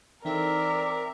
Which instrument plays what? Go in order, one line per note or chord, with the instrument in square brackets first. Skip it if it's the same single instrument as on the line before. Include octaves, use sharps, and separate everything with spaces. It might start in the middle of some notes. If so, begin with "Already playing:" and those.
[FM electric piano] E3 D#4 A4 [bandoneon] C4 E5 [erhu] A#4 [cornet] D5